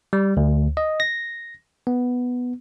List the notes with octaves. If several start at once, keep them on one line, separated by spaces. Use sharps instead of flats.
G3
D2
D#5
A#6
B3